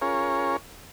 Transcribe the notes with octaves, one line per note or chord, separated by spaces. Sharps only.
C#4 F4 G#4 A#4 C#5